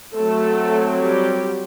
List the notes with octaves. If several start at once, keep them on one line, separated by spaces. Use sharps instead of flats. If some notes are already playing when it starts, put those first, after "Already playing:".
F#3 A3 C4 A4
G3 G4